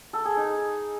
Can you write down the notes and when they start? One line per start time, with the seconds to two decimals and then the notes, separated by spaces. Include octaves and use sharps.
0.13 A4
0.25 G#4
0.37 D#4